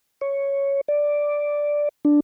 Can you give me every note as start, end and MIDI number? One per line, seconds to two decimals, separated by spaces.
0.21 0.81 73
0.88 1.89 74
2.05 2.20 62